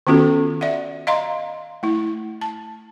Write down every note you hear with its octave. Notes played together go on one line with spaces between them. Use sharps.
D#3 B3 C#4 F4 F#4 A4
D5 E5 F#5
D#5 F5 A#5 C6
A3 E4
A5